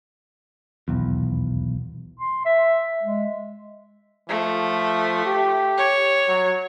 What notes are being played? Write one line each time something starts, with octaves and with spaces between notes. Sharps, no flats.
D#1 B1 E2
C6
E5
G#3
F3 A3
G4
C#5
F#3